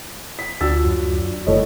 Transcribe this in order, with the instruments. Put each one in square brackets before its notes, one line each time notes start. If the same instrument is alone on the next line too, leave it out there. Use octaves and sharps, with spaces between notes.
[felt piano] B6
[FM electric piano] D2 F4 F#4 [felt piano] D4 E6 A6
[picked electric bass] F#2
[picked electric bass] F#1 G3 [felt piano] D3 A3 E4 [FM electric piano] A4 C#5 D#5